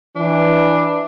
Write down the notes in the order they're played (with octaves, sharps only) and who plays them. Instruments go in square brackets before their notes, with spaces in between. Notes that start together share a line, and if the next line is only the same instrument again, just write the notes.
[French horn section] E3 [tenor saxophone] D4